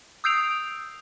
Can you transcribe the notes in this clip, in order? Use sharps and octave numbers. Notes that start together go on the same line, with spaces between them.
D#6 E6 G6 C7 D7 F7